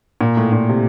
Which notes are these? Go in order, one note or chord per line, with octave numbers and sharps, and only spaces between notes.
A#2
A2
A#2
C3